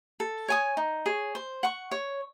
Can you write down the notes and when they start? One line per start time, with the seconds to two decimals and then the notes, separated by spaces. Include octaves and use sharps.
0.20 A4
0.48 C#5 G#5 D#6
0.77 D#4
1.06 G#4 C#5
1.35 C5
1.63 F#5 C#6
1.91 C#5